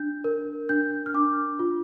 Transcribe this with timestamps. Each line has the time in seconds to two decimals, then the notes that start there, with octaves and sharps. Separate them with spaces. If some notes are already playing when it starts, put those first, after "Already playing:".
Already playing: D4 G6
0.24 A#4
0.69 D4 G6
1.06 F6
1.14 D4 D6
1.59 F4